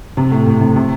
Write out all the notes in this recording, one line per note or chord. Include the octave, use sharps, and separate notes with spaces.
C3
A2
A2
C3
C3